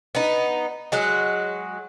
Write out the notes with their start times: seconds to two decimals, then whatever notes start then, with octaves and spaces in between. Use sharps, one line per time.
0.15 B3 D#4
0.92 F#3 G#3 F#4